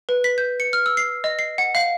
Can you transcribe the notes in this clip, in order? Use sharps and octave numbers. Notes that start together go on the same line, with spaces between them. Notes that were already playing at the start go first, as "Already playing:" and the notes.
B4
B6
G6
C#7
F6
E6
C7
D#5
C7
F#5
F5